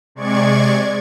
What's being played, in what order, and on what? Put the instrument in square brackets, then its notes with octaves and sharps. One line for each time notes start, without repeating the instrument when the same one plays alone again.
[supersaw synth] C3 G#3 D5 C#6 G#6